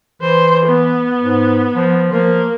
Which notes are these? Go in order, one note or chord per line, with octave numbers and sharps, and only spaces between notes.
E3 C5
B3
G#2
F3
F3 A#3